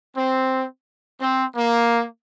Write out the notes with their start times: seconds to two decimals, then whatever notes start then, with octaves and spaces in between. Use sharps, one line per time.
0.16 C4
1.20 C4
1.56 A#3